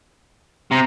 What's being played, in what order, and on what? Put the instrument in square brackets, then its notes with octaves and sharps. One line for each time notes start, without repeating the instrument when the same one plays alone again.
[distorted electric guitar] C3 [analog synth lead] A#5